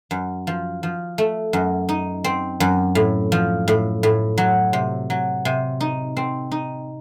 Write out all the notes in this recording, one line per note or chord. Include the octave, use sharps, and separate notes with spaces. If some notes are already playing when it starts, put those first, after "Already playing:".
F#2
F3
F3
A3
F#2
D#4
C4
F#2
A2
F3
A2
A2
F#3
C3
F#3
C3
D#4
C4
D#4